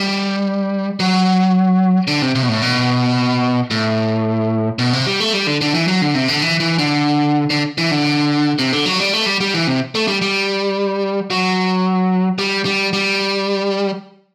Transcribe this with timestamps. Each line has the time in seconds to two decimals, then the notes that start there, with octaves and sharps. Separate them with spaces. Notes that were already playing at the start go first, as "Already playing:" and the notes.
Already playing: G3
1.00 F#3
2.08 D3
2.22 C3
2.35 C3
2.43 B2
2.49 A2
2.62 B2
3.71 A2
4.79 B2
4.93 C3
5.06 G3
5.20 A3
5.33 G3
5.47 D3
5.61 D3
5.75 E3
5.88 F#3
6.02 D3
6.14 C3
6.28 D3
6.42 E3
6.60 E3
6.79 D3
7.50 D3
7.78 E3
7.91 D3
8.59 C3
8.73 D3
8.86 F#3
9.00 G3
9.14 A3
9.26 G3
9.41 G3
9.54 E3
9.67 C3
9.95 A3
10.08 G3
10.22 G3
11.30 F#3
12.39 G3
12.65 G3
12.93 G3